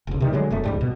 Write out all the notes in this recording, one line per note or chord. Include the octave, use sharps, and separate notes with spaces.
F1 C#2
C3 D#3 G3
D3 F#3 G#3
E1 F#2 A3
C#2 G#2 G3
B2